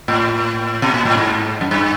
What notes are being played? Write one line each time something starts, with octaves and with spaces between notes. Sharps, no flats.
A2
B2
A#2
A2
G#2
F#2
G2